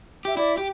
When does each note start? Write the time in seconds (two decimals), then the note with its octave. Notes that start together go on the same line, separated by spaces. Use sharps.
0.25 G4 E5
0.37 E4 D5
0.57 G4